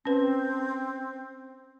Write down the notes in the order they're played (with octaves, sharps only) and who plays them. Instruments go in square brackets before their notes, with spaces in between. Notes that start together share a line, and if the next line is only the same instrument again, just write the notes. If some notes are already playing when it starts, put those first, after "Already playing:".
[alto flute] C4 [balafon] C#4 B4